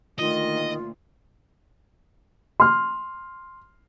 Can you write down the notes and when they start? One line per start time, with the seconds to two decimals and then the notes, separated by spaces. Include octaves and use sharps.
0.18 D2 A#2 D#3 F4 D#5
2.60 C6 F6